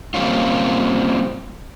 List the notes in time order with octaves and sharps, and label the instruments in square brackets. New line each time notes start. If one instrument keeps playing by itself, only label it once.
[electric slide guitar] G3 A#3 C4 C#4 F4